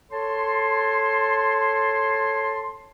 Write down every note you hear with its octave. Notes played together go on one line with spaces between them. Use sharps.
A4 C#5 A5 C6